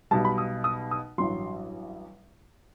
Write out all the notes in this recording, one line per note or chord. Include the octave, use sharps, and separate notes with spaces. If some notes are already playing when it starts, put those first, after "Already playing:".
B1 B2 G3 A5
B5
D#6
D#6
D#6
A1 G2 F#3 C6